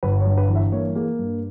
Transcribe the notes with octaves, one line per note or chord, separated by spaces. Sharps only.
G1 B4
C#5
G2
B4
E3
E5
A#3 C#5
A#3 G#4
G2